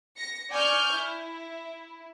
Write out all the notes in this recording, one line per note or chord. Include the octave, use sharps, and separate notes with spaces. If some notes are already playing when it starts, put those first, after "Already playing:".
A#6 C#7
D5 G#5 C#6 F6 G6
E4